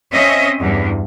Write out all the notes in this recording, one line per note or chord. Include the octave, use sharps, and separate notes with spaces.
C4 C#4 D#5 E5
E2 G2